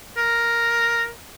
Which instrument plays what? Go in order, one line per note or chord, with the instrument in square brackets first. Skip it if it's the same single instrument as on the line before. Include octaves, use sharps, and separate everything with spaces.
[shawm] A#4